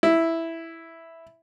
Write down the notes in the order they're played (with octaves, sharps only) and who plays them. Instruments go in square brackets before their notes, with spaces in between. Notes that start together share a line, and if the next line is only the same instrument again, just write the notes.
[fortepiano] E4